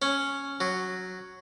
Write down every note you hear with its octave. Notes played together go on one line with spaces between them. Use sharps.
C#4
F#3